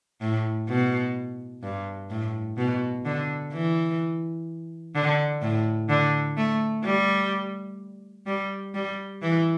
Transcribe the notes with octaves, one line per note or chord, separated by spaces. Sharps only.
A2
B2
G2
A2
B2
D3
E3
D3
A2
D3
A3
G3
G3
G3
E3